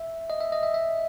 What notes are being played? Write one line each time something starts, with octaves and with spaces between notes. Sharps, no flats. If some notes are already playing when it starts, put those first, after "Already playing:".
Already playing: E5
D#5
E5
D#5
E5
E5